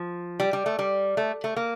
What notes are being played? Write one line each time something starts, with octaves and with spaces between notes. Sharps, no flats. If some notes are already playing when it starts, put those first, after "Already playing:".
Already playing: F3
G3
G3
A3
G3
A3
A3
A#3